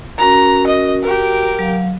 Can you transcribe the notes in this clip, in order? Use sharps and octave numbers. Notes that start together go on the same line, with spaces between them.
C#4 F#4 A#4 A#5
D#5
F#4 G4 A#4
F#3 F5